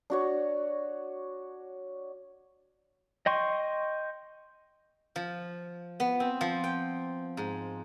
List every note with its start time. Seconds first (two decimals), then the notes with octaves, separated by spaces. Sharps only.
0.10 D4 F#4 C#5
3.26 D#5 G5 C6 C#6
5.16 F3
6.00 B3
6.20 C4
6.41 F3
6.64 G5
7.37 G#2